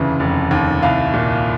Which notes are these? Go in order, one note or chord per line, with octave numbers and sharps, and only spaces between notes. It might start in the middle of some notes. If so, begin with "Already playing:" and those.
Already playing: F1 D#2 C#3 E3 E5
F1
D#2
C2 F5
A#2